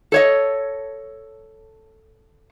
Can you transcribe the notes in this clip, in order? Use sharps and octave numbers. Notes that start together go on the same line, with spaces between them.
A4 C#5 D#5